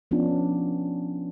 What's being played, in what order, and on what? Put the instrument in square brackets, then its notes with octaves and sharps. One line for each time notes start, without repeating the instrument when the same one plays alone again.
[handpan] F3 B3 C#4 D4 F4